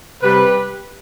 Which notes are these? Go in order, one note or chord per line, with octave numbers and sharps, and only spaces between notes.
C3 G3 G4 B4